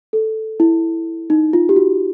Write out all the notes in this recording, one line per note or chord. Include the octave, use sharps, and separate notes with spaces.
A4
E4
D#4
F4
G4
F#4